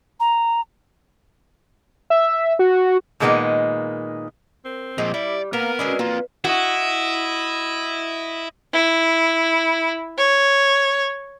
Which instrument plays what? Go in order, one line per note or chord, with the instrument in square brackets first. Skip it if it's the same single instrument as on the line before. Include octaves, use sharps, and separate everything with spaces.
[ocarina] A#5
[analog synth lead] E5
F#4
[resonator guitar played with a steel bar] A#2 D#3 G#3 A#3 B3 D#4
[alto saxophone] C4 [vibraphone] A#4
[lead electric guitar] A#2 F3 [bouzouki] G#3 [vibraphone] D6
[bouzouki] G3 [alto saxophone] E4 [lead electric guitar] D5
[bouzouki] A#3 A#5 [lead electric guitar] B3 B4 [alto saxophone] A#4
[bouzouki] G#3 G#4 D5 [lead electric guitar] C#4 B5 [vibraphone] F#4 B4 E6
[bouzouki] A#3 [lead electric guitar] C4 F4 [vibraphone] B4
[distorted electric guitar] E4 [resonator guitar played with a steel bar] F#4 [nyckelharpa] D#5
[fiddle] E4
C#5